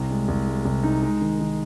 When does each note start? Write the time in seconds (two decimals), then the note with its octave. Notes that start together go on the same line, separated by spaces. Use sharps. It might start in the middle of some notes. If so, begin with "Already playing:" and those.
Already playing: C2
0.10 G#3
0.28 C2
0.47 G#3
0.65 C2
0.83 D#4
1.02 G#3
1.21 D#3
1.40 D#3